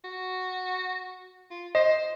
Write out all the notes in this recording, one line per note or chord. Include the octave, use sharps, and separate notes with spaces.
F#4
F4
C5 D#5